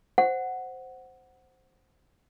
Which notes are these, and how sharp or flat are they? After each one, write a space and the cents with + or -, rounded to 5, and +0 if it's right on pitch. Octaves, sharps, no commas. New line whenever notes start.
C5 +0 F#5 +0